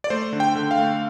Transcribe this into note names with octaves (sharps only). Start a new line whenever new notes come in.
D5
A3 C5
D3
G5
D3
F5
A3